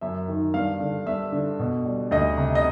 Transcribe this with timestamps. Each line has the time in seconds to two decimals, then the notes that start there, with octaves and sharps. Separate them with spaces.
0.01 F#2 E5
0.28 D#3
0.54 G2 F5
0.80 D3
1.06 G2 E5
1.32 D3
1.59 B2
1.85 G3
2.11 D2 D#5
2.37 C3
2.55 D#5